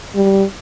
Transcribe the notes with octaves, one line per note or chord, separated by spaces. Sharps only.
G3